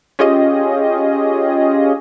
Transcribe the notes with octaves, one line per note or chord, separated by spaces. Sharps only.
C#4 F4 G4 G#4 D#5